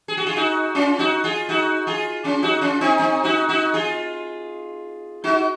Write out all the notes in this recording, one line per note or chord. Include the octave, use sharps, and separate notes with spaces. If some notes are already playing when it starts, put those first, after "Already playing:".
G#4
F#4
F4 G#4
D#4 F#4
C#4 F4
D#4 F#4
F4 G#4
D#4 F#4
F4 G#4
C#4 F4
D#4 F#4
C#4 F4
C4 D#4
C4 D#4
D#4 F#4
D#4 F#4
F4 G#4
D#4 F#4